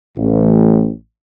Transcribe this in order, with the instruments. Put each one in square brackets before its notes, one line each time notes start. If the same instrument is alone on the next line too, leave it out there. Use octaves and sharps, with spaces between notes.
[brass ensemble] A1